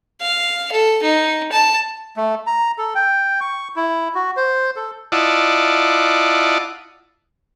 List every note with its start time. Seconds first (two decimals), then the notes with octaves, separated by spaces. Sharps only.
0.21 F5
0.72 A4
1.03 D#4
1.52 A5
2.16 A3
2.47 A#5
2.78 A4
2.95 G5
3.41 C#6
3.76 E4
4.15 F#4
4.37 C5
4.76 A4
5.12 E4 F4 D5 D#5 F#5 A5